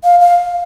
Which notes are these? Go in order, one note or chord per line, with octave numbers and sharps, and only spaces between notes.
F5
F5